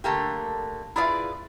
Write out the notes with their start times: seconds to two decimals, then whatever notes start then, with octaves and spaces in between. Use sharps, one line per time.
0.04 D3 A3 A#3 G4
0.96 E4 F4 G#4 B4 D5 F5